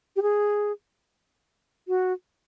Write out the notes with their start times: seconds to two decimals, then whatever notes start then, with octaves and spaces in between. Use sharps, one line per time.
0.16 G4
0.22 G#4
1.88 F#4